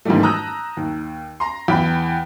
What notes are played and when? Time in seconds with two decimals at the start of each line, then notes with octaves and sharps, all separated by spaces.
0.05 G#2 D#3 E3 F#3 G3 A3
0.23 A5 A#5 D#6 E6 F#6 G6
0.77 D#2
1.40 A#5 C6
1.68 E2 G5 B5